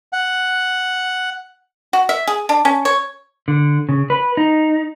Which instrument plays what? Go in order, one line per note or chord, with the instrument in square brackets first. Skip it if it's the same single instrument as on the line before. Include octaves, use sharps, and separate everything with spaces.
[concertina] F#5
[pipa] F#4
E5
G#4
D4
C#4
C#5
[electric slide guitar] D3
C#3
B4
D#4